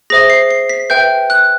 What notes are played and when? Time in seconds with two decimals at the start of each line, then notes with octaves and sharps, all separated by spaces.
0.10 G#4 C5 E5 A#6
0.30 C7
0.51 C7
0.69 B6
0.90 B4 E5 G5 G6
1.30 F#6